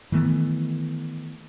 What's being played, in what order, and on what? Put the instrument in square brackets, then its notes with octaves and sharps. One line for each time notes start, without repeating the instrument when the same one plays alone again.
[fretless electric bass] D#3 E3 A3 B3